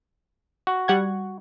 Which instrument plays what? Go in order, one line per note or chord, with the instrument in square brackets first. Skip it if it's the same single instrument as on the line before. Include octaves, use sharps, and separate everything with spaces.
[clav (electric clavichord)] F#4
[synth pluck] G3 F#5 G#6